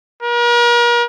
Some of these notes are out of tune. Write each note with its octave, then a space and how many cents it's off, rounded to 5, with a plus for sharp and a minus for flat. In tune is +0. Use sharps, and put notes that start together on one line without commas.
A#4 +40